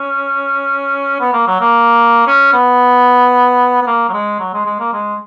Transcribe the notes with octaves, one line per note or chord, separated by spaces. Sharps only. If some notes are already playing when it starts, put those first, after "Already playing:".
Already playing: C#4
B3
A#3
F#3
A#3
C#4
B3
B3
A#3
F#3
G#3
F#3
G#3
G#3
A#3
G#3